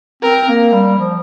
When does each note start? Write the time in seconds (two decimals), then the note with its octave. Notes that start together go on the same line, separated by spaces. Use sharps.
0.22 C4 A#4
0.48 A#3
0.72 G3
0.98 F3